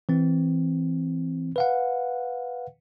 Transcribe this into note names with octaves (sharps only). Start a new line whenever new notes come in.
E3 C4
B4 F5 F#5